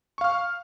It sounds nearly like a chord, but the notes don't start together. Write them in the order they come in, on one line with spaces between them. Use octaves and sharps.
C#6 F5 F6